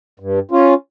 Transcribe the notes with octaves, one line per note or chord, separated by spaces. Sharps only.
G2
C#4 F4